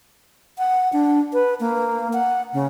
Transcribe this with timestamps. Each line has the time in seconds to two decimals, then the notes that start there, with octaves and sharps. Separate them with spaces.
0.58 F#5
0.93 D4
1.33 B4
1.60 A#3
2.13 F#5
2.54 C#3